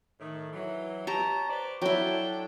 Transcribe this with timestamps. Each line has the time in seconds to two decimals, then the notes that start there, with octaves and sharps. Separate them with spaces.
0.20 A2 D#3
0.53 E3 F#3
1.07 G4 C#5 A5 A#5
1.49 B4 C5 D5
1.82 F#3 D4 E4 A4 G5